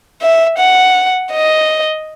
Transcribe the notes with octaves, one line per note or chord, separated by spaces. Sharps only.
E5
F#5
D#5